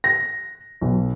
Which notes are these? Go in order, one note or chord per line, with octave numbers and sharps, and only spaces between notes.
A#6
B1